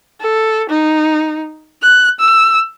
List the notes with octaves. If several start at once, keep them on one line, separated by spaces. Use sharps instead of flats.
A4
D#4
F#6
E6